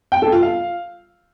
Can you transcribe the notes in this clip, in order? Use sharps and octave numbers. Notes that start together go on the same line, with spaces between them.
G5
A4
F4
F5